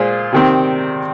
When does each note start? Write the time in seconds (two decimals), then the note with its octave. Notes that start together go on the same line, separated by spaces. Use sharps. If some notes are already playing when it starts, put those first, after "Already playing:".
Already playing: A#2 G#3 F4 G#4 C5
0.33 C3 D#3 C4